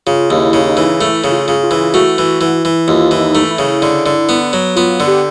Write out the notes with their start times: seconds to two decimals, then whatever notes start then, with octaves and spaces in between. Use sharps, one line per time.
0.06 C#3 F4
0.30 D#2
0.38 E4
0.53 C#3
0.69 D#4
0.77 E3
1.00 A3 E4
1.24 C#3
1.31 F4
1.48 C#3
1.63 F4
1.71 E3
1.94 A3 F#4
2.18 E3
2.41 E3
2.65 E3
2.88 D#2 F4
3.11 E3
3.20 D#4
3.35 A3
3.51 E4
3.59 C#3
3.82 D3
4.06 D3
4.29 B3
4.53 F#3
4.76 B3 F4
5.00 D3
5.07 G4